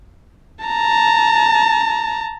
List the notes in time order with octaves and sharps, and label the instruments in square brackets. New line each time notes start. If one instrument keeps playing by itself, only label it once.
[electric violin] A5 A#5